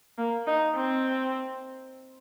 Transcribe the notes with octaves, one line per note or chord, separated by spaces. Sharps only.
A#3
D#4
C4